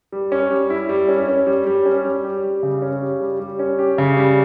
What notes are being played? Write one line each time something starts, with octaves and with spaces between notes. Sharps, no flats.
G3
C#4
G3
E4
G3
C#4
C#4
G3
G3
C#4
G3
G4
G3
C#3
C#4
G4
G3
G3
C#4
G4
C#3
G3